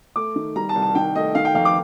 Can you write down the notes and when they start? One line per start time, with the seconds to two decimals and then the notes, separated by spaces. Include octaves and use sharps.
0.16 A3 D6
0.36 D#3
0.56 G3 A#5
0.69 A5
0.75 C2
0.82 A5
0.95 D#3 G5
1.15 A3 D#5
1.35 D#3 F5
1.45 G5
1.55 F2 F5
1.65 D6